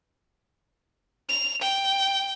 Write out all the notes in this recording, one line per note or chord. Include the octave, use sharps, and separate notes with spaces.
F7
G5